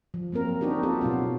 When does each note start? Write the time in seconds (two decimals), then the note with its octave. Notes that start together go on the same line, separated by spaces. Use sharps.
0.14 F3
0.32 F#3 A#3 C4 A#4
0.61 C4 D4 D#4 F#4 G4
0.83 B3 C4 F4 G4 A4
1.01 B2 F#3 B3 F4